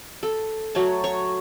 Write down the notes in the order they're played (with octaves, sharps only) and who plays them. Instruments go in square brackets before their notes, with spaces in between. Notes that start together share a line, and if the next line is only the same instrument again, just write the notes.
[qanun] A4
F#3 A3 C#5 A5
C#5